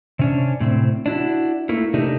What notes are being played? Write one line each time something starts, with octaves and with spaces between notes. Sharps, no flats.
C3 C#4 D4
A2 C3 C4
D4 E4 F#4
A3 A#3 E4
C3 A3 D4 D#4 G4 A#4